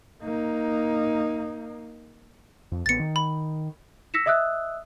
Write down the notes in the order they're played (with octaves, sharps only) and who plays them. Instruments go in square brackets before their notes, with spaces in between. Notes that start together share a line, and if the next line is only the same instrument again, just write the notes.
[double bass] A#3 D#4
[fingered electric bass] F2
[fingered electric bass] A1 B3 [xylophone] A6 C#7
[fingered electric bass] D#3
[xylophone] B5
[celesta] E6 A#6 B6 C#7 E7
D#5 E5 D#6 E6 F#6